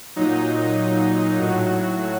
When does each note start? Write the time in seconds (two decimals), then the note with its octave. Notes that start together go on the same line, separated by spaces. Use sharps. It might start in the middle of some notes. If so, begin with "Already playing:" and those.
0.16 A#2 F#3 D#4
1.39 A2 F#3 F#4
1.70 F#4